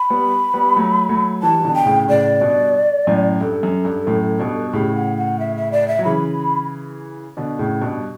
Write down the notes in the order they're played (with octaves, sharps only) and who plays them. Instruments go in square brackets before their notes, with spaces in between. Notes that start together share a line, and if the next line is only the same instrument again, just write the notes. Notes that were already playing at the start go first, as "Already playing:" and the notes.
Already playing: [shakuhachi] B5
[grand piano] G3 B3
G3 B3
F#3 A3
F#3 A3
[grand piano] E3 G3 [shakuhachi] A5
[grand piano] E3
B2 D3
[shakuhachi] G5
[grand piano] A2 C#3
[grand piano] A2 C#3 [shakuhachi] D5
[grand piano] G2 B2
F#2 A2
[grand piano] G2 [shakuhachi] A4
[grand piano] F#2
G2
F#2 A2
G2 B2
[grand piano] A2 C#3 [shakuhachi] G4
[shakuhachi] F#5
F#5
E5
E5
D5
E5
[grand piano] F#3
[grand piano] C#3 E3 [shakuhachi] B5
[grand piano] B2 D3
A2 C#3
G2 B2